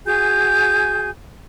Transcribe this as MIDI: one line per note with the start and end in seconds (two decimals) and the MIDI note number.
0.06 1.10 66
0.06 1.10 68
0.06 1.10 80
0.06 1.10 91